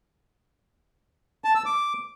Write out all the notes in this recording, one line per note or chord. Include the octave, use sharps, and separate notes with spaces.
A5
E6
D6